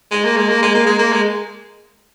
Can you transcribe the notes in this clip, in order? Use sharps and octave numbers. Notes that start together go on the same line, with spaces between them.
G#3
A#3
G#3
A#3
G#3
A#3
G#3
A#3
G#3